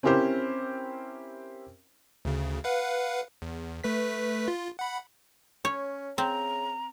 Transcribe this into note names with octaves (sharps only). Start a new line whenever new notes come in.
C4 C#4 E4 G4 A#4 C5
D2 C#3
B4 F5 F#5
E2
A3 B4 B6
F4
F#5 B5
C#4 C#5
C#3 C4 A#5